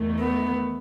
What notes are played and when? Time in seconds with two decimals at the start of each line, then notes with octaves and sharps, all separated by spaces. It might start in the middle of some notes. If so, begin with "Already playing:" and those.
Already playing: E2 D#3 A3
0.19 B3